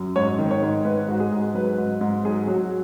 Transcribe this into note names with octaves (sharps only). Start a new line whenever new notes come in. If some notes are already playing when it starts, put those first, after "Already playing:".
Already playing: F#2
G#2 C#5
D#3
C#5
G#2
G#2 B4
G#2 F#4
G#4
G#2
F#3 B4
G#2
G#2
F#3 G#4
F#3 F#4